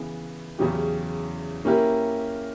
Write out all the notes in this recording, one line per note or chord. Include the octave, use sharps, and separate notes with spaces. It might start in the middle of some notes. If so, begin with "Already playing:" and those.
Already playing: C#3 E3 B3
E2 C#3 F#3 C#4 G4
A#3 C#4 E4 G4 A#4